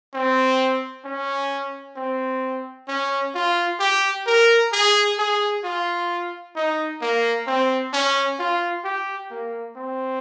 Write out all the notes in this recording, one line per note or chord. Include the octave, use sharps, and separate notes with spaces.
C4
C#4
C4
C#4
F4
G4
A#4
G#4
G#4
F4
D#4
A#3
C4
C#4
F4
G4
A#3
C4